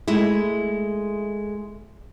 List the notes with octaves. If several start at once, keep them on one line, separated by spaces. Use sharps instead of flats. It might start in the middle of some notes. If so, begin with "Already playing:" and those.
G#3 A3 E4